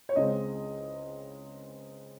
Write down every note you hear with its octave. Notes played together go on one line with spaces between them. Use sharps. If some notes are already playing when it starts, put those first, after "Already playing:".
C#5
C#2 C#3 G#3 C4 D#5